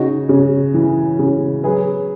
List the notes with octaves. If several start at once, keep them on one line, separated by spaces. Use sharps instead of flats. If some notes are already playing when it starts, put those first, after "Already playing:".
Already playing: C#3 D#4 F#4
C#3
E3
C#3
F#3 G#4 B4